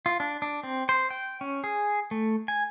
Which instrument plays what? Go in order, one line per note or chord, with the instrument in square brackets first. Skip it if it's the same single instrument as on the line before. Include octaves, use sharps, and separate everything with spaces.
[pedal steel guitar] F4
D4
D4
C4
C5
G5
C#4
G#4
A3
G#5